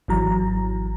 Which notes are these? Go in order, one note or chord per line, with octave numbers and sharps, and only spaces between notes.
G#1 E3 F#3 A#5